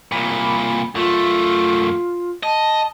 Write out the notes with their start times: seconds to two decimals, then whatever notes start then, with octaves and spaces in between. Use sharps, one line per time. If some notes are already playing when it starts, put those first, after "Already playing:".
0.12 C2 A#2 B5
0.95 F#2 A3 F4
2.43 D#5 A5